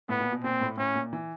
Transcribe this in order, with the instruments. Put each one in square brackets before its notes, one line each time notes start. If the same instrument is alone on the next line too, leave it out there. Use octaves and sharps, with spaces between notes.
[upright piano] A2 [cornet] B3
[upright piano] A#2
B2
[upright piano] A#2 [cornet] C4
[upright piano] A2
[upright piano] A2 [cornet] C#4
[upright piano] A#2
E3